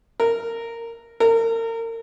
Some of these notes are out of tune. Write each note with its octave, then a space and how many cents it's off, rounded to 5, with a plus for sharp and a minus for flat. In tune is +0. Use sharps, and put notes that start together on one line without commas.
A#4 -15
A#4 -35